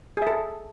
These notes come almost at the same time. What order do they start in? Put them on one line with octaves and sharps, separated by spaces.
G#4 E5 A4